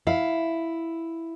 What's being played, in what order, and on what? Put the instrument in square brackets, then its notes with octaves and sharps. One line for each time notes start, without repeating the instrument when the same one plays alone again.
[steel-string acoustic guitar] E4 F5